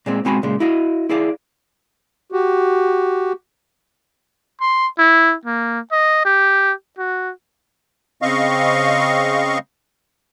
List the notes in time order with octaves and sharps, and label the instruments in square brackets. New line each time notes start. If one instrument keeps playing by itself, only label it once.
[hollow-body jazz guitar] A#2 G#3 C4
B2 G#3 C4 F#4 G#5 B5
A#2 C#3 G#3
E4 F#4 D#5 F5
E4 G#4 D5 F5
[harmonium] F#4 G4
[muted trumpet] C6
E4
A#3
D#5
G4
F#4
[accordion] C#3 C4 D#5 F5 C#6